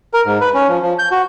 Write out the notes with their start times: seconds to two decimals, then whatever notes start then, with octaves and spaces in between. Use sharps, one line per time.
0.14 A#4
0.26 G#2
0.41 B4
0.54 C#4
0.68 F3
0.82 F3
0.99 G6
1.11 F#4